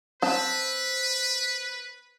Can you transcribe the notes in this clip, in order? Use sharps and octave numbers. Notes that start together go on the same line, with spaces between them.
C4 B4 A5